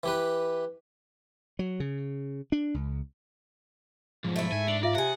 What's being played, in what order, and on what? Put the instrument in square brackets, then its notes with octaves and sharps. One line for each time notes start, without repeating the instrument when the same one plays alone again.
[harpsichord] E3 G4 B4
[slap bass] F#3
C#3
D4
C#2
[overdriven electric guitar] B1 G#2 [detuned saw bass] F3
[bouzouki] A3 E4
[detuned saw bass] G#2 [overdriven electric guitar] G#5
[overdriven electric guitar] D4 [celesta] D7 F7 F#7
[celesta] F4 E5 F5 [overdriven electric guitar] D5
[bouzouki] C3 G#4 [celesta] E5 [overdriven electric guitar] F#5